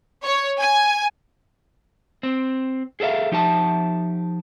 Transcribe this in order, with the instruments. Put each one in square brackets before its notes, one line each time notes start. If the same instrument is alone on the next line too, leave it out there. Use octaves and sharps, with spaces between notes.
[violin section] C#5
G#5
[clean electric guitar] C4
G#4 A4 C5 E5 F5
F3 D#4 G4 E5 A5